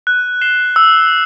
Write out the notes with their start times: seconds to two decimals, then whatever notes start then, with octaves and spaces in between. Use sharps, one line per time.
0.07 F#6
0.41 C7 E7 G7
0.76 E6